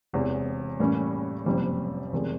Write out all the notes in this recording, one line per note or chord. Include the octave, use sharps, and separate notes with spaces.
E1 E2 C3
A2 E3 G3 A#3 C#4
F#1 F2 C3 E3 G3
F1 E2 C3 D#3 G#3